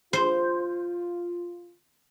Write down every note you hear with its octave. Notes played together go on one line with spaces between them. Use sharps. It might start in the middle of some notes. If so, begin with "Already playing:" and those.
F4 C5